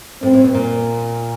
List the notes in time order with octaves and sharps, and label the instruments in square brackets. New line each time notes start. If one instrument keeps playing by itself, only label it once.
[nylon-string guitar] A2 [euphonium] C4
[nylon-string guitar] A2
B2
A#2